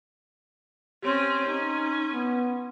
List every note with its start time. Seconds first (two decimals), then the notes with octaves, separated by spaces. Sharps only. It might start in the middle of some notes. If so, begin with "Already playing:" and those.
1.02 C4 C#4 G4 C#5 C6
1.45 C#4 D#4 C6
2.10 B3